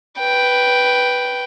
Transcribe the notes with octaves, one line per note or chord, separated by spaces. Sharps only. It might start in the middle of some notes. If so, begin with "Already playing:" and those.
B4 G5